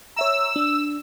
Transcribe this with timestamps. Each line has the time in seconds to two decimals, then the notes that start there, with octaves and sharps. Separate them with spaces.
0.16 C#5 E5 A#5 E6
0.56 D4